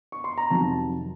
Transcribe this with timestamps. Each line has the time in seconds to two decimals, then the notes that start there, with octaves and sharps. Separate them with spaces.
0.12 C#6
0.24 C6
0.38 A#5
0.50 F2 C3 D#3 F#3 A5